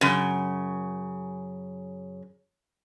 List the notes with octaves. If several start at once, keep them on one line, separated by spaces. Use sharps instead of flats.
F#2 C#3